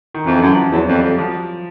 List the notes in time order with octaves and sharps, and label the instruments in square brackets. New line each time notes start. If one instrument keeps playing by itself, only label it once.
[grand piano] D#3
[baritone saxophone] F2 [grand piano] E3
[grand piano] F3
[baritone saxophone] F#2
[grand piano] F3
F3
[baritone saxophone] E2 [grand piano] F#3
[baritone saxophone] F2
[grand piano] G3
[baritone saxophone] F2
[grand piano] F3